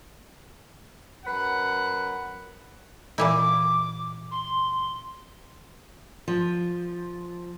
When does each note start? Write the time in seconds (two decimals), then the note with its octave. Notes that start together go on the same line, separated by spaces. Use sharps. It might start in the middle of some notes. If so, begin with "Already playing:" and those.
1.25 F#2 B4 F#5
3.18 A#2 E3 E4 D6
4.31 C6
6.28 F3